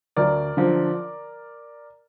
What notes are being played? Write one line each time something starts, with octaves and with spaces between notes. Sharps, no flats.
D2 A#4 D5
D3 F3